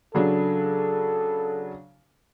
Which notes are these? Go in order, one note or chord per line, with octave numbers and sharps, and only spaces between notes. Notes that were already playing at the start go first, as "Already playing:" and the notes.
C#3 F#3 D4 A4